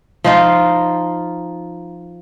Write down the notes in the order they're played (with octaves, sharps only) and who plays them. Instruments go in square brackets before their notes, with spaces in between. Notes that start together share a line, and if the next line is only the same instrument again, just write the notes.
[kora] F3 D#4 F4